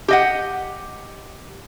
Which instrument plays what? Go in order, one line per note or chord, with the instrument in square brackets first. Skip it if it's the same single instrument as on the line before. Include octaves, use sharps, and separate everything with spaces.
[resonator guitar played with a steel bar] G4 D#5 F#5